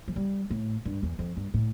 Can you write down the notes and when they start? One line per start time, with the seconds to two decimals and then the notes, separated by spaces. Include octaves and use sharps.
0.08 F3
0.16 G3
0.50 A2
0.85 G2
1.02 E2
1.19 F2
1.37 G2
1.54 A2